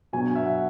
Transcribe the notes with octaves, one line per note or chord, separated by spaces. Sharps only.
B2 F#3 B3 D4 G#5
E5
F#5